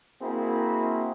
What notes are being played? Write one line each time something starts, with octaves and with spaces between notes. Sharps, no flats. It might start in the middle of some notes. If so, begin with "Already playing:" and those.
A#3 C4 E4 F#4 G#4